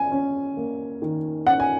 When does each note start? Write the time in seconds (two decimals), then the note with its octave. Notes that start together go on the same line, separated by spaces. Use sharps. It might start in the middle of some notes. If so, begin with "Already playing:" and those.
Already playing: C#4 G#5
0.12 C#4
0.57 A#3
1.02 D#3
1.47 C#4 F#5
1.60 G#5